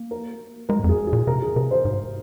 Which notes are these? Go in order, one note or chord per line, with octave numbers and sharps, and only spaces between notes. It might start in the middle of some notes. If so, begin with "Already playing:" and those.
Already playing: A#3
A#4
G#3 A#4
G#2
F2
G#4
G#4
A#2
C3 A#4
G#4
C3 A#4
C5
G#2